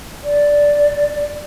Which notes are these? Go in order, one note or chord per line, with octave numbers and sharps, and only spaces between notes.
D5